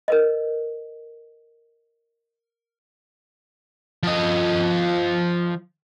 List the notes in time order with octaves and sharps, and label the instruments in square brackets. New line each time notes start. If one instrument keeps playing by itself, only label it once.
[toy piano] A#4 B4 D#5
[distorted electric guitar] F3 D#5